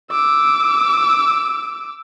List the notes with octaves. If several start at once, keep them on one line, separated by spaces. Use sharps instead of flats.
D6 E6